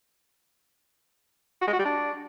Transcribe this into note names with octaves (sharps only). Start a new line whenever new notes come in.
F#4
G#3
F#4
G3
D4